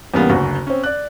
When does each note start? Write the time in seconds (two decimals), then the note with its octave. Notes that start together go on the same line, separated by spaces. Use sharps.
0.14 E2 C#3 G3 A#3 B3
0.30 F#1 D2 F#4
0.67 C4 C#4
0.83 D5 F#6